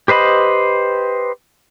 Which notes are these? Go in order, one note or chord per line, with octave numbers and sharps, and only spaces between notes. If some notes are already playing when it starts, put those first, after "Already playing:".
G4 B4 C5 D#5 B5